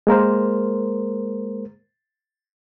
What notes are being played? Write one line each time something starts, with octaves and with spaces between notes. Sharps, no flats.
G#3 A#3 A#4 C5